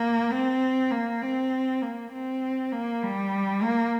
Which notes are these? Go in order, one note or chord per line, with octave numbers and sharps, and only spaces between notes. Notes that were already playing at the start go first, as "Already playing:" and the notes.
Already playing: A#3
C4
A#3
C4
A#3
C4
A#3
G3
A#3